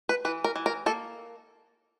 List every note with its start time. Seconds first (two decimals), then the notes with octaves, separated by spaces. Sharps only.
0.09 B4
0.25 E3 B4
0.44 A#4
0.56 E3
0.66 A#4
0.86 A#3 A4